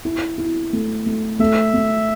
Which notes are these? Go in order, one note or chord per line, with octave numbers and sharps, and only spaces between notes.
E4
E4
A3
A3
A3 E5
A3